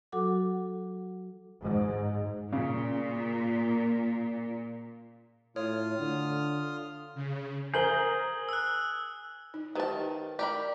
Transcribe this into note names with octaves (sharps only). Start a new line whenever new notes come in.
F#3 F#4 A4 F#5 D6
G#2
A#2 C#3
A2 F4 C#5 D#6 F6
D3
C#3
G#4 A#4 C5 G#5 A#5 G6 F#7 G7
E6 F#6
D#4
D#3 G4 B4 C5 A5
G4 A#4 D5 B5